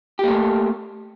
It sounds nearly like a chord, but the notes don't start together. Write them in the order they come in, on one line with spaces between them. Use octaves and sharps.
G4 A#3 A3